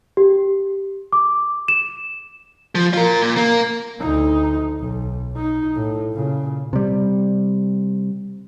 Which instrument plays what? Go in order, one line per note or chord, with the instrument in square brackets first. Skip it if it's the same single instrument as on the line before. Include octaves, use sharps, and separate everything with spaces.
[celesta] G4
D6
E7
[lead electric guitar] F3
F4 A#4
A#2
A#3
[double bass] D2 D#4
B1
D#4
A2
A#2 C#3
[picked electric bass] C3 G3